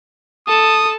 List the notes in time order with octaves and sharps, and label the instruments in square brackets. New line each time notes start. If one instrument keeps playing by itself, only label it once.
[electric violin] A4 A5 [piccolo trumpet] D#6